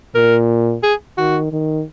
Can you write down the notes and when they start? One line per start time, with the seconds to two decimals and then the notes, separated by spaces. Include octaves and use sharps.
0.15 A#2 A#4
0.83 G#4
1.17 D#3 F#4
1.52 D#3